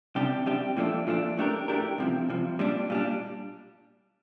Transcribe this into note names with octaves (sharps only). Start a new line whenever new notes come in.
C2 C3 G3 D4 G4
C2 C3 G3 D4 G4
A#2 F3 A3 D4
A#2 F3 A3 D4
A2 A3 D4 G4 A#4
A2 A3 D4 G4 A#4
C2 C3 F3
C2 C3 F3
A#2 G3 D4
A#2 G3 D4